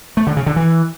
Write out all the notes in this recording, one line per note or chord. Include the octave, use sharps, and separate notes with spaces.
A3
D3
C#3
D3
E3